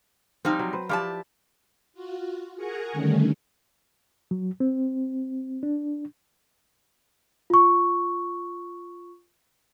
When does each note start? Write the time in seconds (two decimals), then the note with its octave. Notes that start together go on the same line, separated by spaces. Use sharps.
0.45 F3 G3 C4 D#4
0.59 F#3
0.73 B4 C5
0.89 F3 E4 G4 D5 A5
1.94 F4 F#4
2.56 G#4 A#4 F#5 G#5 A#5 C#6
2.93 D3 D#3 G3 A3 C#4
4.31 F#3
4.60 C4
5.63 D4
7.50 F4 C#6